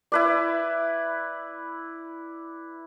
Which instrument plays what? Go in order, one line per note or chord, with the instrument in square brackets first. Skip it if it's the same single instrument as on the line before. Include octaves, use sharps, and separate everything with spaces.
[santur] E4 B4 D5